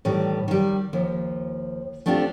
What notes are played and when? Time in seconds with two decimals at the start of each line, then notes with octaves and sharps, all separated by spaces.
0.05 A2 D#3 E3 G3
0.48 D#3 G3
0.93 D#2 F3
2.06 A3 C4 D4 E4 F4 G4